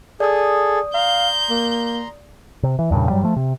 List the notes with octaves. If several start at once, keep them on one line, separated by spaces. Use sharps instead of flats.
G#4 A4 D5 D#6
F5 A#5 C6 G6
A#3
C3
E3
E2 G2 A#2 C#3
G2 F#3 G3
F3 A3
C3